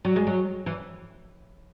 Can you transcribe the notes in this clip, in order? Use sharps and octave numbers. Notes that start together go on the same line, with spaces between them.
F#3
G#3
F#3
E3